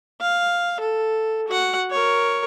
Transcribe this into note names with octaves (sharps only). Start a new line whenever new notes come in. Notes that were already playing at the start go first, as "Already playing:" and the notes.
F5
A4
F#4 F#5
A#4 C#5